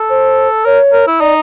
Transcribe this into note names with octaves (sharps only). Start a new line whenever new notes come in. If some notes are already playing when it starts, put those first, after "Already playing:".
Already playing: A4
C5
A#4 C#5
A#4
E4
D#4 D5